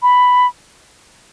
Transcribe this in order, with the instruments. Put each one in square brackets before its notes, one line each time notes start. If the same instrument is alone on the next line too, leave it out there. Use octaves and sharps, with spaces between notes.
[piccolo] B5